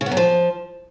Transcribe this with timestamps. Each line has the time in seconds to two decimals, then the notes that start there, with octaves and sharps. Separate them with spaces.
0.01 C#3
0.06 B3
0.11 F#2
0.17 F3